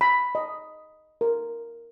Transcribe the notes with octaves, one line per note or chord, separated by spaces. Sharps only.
B5
D#5
A#4